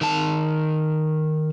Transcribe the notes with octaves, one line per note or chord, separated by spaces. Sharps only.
D#3 A5